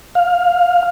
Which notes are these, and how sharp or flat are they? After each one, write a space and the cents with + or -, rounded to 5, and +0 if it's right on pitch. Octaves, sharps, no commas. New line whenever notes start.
F5 +15